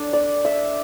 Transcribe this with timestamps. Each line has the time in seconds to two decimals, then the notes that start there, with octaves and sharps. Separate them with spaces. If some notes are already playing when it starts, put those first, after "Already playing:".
Already playing: D4 A4
0.13 D5
0.45 E5